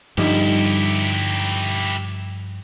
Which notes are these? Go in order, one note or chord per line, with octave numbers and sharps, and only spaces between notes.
G2 D3 F3 G3 D#4 E4 G4